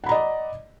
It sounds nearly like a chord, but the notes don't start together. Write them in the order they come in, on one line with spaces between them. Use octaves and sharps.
F#5 B5 A#5 D#5 D5